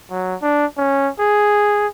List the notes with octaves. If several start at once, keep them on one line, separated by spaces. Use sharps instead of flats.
F#3
D4
C#4
G#4